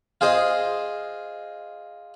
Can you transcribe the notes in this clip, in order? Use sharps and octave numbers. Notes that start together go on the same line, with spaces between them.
F4 G#4 C5 D#5